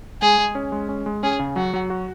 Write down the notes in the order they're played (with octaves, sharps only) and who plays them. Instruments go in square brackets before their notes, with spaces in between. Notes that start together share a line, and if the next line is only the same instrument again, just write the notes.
[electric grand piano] G#3 [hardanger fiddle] G#4
[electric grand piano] G#3
C#4
G#3
C#4
G#3
[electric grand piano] C#4 [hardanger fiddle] G#4
[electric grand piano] C#3
[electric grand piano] F#3 [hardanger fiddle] F#4
[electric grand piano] F#3
F#4